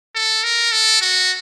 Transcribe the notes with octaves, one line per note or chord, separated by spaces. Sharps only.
A4
A#4
A4
F#4